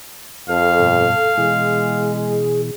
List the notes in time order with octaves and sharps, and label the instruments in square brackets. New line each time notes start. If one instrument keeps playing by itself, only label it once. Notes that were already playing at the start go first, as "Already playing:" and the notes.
[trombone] F2 [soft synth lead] A4 [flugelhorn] F5
[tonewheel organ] G2 B2
[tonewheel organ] B2 E3 [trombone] G#3 [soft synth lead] G#4